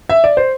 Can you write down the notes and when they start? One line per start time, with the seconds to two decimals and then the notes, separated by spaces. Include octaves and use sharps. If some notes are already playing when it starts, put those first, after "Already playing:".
0.09 E5
0.24 D5
0.37 C5